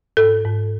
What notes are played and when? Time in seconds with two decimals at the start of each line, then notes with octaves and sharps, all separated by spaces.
0.17 G#2 A4
0.45 G#2